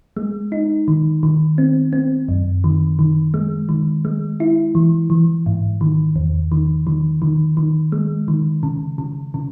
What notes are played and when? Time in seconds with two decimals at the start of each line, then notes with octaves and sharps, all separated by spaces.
0.17 G#3
0.52 D#4
0.88 D#3
1.23 D#3
1.58 C4
1.93 C4
2.28 F#2
2.64 D#3
2.99 D#3
3.34 G#3
3.69 D#3
4.05 G#3
4.40 E4
4.75 E3
5.10 E3
5.46 G#2
5.81 D#3
6.16 E2
6.52 D#3
6.87 D#3
7.22 D#3
7.57 D#3
7.92 G#3
8.28 D#3
8.63 C#3
8.98 C#3
9.34 C#3